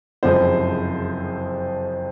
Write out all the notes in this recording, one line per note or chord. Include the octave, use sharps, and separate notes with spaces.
F#1 F2 C3 F3 G#3 C5